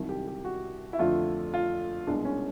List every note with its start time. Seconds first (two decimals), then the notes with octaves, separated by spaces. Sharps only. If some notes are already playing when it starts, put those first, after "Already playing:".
Already playing: C2 C3 D#3 F#3
0.09 G4
0.27 G4
0.45 F#4
0.93 E4
0.99 F2 D3 F3 A3 F4
1.54 F4
2.07 C2 B2 G#3 D4
2.25 C#4